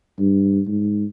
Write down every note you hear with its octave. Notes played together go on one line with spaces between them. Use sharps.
G2
G#2